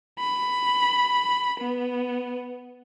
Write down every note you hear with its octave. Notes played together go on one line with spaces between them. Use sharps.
B5
B3